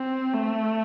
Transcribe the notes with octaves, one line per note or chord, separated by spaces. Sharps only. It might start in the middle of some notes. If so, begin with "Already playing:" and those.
Already playing: C4
A3